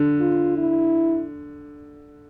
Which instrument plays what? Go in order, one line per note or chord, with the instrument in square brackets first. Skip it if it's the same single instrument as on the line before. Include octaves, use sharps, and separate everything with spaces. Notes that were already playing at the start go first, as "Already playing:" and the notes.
Already playing: [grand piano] D3
[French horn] F4
E4